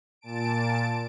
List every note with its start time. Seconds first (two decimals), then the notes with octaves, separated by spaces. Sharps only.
0.21 A#2 A5 D7